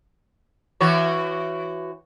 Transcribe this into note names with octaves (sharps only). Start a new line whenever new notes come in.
E3 F#4 C#5